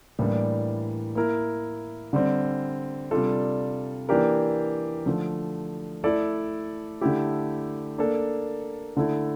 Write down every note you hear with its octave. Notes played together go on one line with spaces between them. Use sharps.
A2 E3 G3 A#3 D4
A#3 E4 A#4
D3 G3 C4
C3 G3 D4 F4 A4
E3 A#3 D4 G4 A#4
D3 F3 A3
A3 E4 A4 D5
D3 A3 E4 G4
A#3 D4 A4
D3 A3 E4